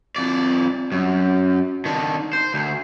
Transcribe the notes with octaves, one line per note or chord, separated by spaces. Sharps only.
F2 D5
F#2
D#3 D4
C5
D2